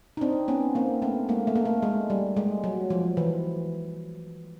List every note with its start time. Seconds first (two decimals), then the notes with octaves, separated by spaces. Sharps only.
0.17 D#4
0.21 C4 D4
0.48 B3 C#4
0.75 A#3 C4
1.02 A3 B3
1.29 G#3 A#3
1.47 A3
1.56 A#3
1.66 A3
1.83 G#3
2.10 G3
2.37 G#3
2.64 F#3
2.90 F3
3.17 E3